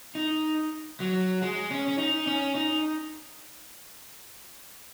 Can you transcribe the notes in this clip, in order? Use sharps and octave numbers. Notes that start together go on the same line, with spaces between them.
D#4
F#3
G#3
C#4
C#4
D#4
C#4
D#4